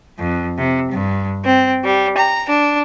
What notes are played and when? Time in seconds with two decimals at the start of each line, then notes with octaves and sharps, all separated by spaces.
0.18 F2
0.58 C3
0.91 G2
1.45 C4
1.84 G3
2.17 A#5
2.49 D4